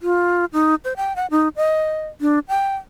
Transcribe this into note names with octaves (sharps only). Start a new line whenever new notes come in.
F4
D#4
C5
G5
F#5
D#4
D#5
D4
G5